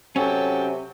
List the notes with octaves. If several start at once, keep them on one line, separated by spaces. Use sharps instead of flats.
C3 F#3 C#4 A4 G5